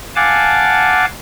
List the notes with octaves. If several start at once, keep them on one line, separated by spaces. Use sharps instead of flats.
F5 F#5 G#5 A5 D6